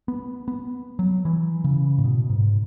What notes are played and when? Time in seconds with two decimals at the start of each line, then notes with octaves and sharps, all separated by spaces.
0.08 B3
0.48 B3
0.99 F#3
1.25 E3
1.64 C#3
1.98 A2
2.04 B2
2.30 G#2